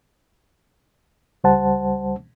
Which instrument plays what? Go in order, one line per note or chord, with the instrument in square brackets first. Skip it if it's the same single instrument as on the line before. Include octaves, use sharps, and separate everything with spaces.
[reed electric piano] C#2 G3 C5 F#5 A5